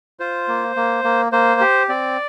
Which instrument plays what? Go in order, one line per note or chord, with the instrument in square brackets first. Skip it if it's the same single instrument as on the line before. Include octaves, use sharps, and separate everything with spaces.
[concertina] F4 C5
A#3
A#3
A#3
A#3 C5
G4
C4 D5